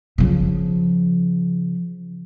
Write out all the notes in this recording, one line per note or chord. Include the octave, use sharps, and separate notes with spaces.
C#3 F3